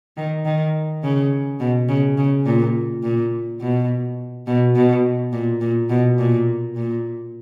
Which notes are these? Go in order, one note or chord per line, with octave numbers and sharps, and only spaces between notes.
D#3
D#3
C#3
B2
C#3
C#3
A#2
A#2
B2
B2
B2
A#2
A#2
B2
A#2
A#2